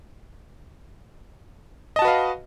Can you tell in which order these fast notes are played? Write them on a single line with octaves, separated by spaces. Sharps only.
D#5 A5 F#4 B4 F5